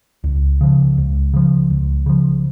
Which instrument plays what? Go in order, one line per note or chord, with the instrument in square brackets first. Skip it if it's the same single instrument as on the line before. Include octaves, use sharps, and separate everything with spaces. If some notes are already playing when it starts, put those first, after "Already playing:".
[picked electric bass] C#2
C#3 F3
C#2
C#3 F3
C#2
C#3 F3